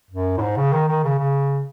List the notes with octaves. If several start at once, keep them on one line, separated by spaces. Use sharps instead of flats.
F#2
A2
G#2
C#3
D#3
D#3
C#3
C#3